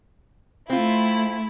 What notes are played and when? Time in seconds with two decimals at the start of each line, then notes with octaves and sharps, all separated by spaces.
0.70 A3 C4 E4 F4